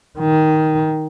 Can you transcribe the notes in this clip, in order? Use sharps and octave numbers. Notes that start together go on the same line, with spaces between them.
D#3